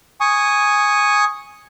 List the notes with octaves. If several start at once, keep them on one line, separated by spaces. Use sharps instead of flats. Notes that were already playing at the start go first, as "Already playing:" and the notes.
G#5 C#6 D#6